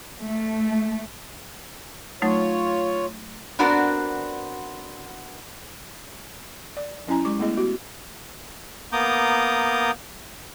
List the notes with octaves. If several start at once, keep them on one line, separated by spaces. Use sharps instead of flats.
A3
F#3 A3 D#4 F4 C#5
B3 C4 D4 F#4 A#4 D5
D5
F#3 C#4 E4 G#5 A#5
G#3 G4 C#6 D6
A3 B3 E4 G#4 D#5
B3 F#4 G4
A#3 B3 A#5 D6 D#6 G6